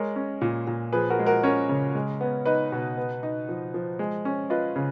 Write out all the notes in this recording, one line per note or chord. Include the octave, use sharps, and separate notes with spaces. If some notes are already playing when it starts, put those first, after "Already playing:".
Already playing: G#3 A#4 C#5
C#4
A#2
A#2
F3 G#4 B4
F#4 A#4
G#3
F#4 A#4
C#4 A#4 C#5
C#3
G#3
B3
D#4 B4 D#5
B2
B3
D#4
F3
F3
G#3
C#4
F4 B4 D#5
C#3